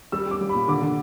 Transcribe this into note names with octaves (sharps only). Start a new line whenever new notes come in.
G3 E6
G3 D6
G3
B5
A#2
D3 D6
D3